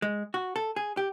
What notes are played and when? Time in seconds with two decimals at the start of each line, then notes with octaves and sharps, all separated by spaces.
0.02 G#3
0.34 F#4
0.56 A4
0.76 G#4
0.97 G4